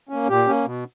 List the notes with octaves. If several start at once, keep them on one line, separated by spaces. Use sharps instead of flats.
A#3 C#4
A#2 G4
A#3 C#4
B2